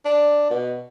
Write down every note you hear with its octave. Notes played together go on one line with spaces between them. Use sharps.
D4
B2